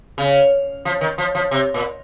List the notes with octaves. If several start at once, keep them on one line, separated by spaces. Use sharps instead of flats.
C#3
F3
D#3
F3
F3
C3
A#2